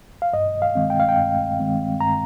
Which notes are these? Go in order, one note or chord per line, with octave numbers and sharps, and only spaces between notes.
F5
G2 D#5
F5
D#3 G#3 C4
G5
F5
G5
G2
D#3 G#3 C4
G2 A#5